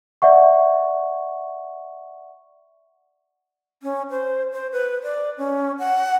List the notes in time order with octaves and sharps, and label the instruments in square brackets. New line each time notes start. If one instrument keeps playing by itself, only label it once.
[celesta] D5 E5 F#5 C#6
[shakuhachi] C#4
C5
C5
B4
D5
C#4
F#5